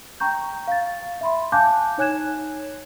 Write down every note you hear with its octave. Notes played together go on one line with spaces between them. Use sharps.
G5 A#5 C#6 G6
F5 A6
E5 B5 C6
F5 G#5 A5 D6 F#6 G6
D#4 C#5 G#5 F#6 G#6 E7